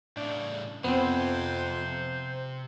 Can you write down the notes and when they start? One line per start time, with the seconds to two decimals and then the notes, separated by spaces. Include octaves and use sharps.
0.17 A2 C#3 D4
0.84 F2 C3 B3 C4 C5